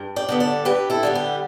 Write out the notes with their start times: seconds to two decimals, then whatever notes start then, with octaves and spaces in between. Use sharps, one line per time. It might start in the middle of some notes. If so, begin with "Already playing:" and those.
Already playing: G2
0.16 D5 G5
0.29 D3 G3 B3
0.40 A4 D5
0.65 G2 G4 B4
0.90 E4 A4
1.03 D3 G3 B3
1.15 G4